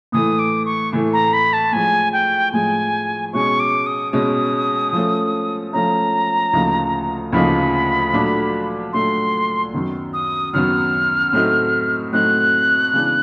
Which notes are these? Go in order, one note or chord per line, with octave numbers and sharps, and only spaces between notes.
A2 E3 A3 D#6
D6
C#6
A2 E3 A3
A#5
B5
A5
A2 F3 G#3 G#5
G5
A2 F3 G#3 G#5
B2 G#3 C#4 C#6
D6
D#6
B2 G#3 C#4 D#6
F3 A3 C#4
F3 A3 C#4 A#5
D2 C#3 F3 A#3 D#4
D2 C#3 F3 A#3 D#4 B5
A#2 F#3 A3 D4
A#2 F#3 A3 D4 C6
F#2 D#3 F#3 B3
D#6
F#2 D#3 F#3 B3 F6
A2 F#3 A3 C4 D#4
A2 F#3 A3 C4 D#4 F#6
C#3 E3 G#3 B3 D4